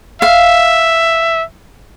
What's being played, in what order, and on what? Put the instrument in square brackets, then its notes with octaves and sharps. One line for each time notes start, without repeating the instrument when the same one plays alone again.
[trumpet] E5 [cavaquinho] F5